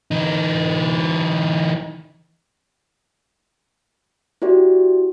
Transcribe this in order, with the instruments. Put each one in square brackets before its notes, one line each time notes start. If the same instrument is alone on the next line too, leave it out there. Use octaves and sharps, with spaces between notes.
[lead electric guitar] E3 D#4
[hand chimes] E4 F#4 G4 D5